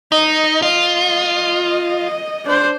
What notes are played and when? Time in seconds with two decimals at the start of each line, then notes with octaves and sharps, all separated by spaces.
0.12 D#4 D#5
0.62 F4 D#5
2.45 D4 C5